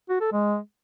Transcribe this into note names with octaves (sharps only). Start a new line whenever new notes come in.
F#4
A4
G#3